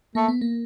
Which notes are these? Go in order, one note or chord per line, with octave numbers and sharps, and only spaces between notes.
A3 A#3
B3
A#3